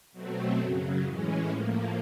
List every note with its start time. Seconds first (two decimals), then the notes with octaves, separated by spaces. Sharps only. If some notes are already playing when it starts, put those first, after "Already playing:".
0.12 B2 F#3 A3 C4
0.58 F#2 C#3 F#3
1.03 A2 E3 G#3 C#4
1.49 A2 F3 A#3